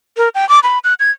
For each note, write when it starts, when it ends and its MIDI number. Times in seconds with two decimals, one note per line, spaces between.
0.17 0.29 70
0.35 0.48 79
0.49 0.60 86
0.63 0.79 83
0.84 0.94 90
1.00 1.11 92